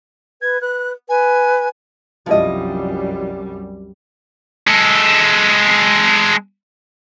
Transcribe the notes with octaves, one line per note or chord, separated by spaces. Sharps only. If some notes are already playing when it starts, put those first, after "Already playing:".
B4 G#6
B4 F#6
B4 G#5
C2 F#2 F3 G3 E4 D#5
G#3 A4